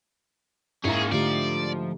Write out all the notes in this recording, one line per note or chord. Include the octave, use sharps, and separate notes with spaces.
G#2 A#3 C#4 E4 G#4 A#5
D3 F3 A3 G4 D5